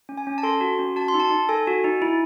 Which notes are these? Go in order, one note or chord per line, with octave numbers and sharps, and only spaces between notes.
C#4
G#5
C#4
A5
A4 C6
F#4
C#4
F#4 A5
C6
D#4
A5
D#4
A4 G#5
F#4
D#4
E4